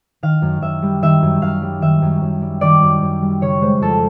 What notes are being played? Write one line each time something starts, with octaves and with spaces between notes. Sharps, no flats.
D#3 F5
F#2
F#2 E5
G3
D#3 E5
F#2
F#2 F5
G3
D#3 E5
F#2
F#2
G3
D#3 D5
F#2
F#2
G3
C#3 C#5
G#3 C5
F2 A4